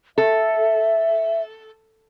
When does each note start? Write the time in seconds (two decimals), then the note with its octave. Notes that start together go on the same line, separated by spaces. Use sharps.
0.18 A4 E5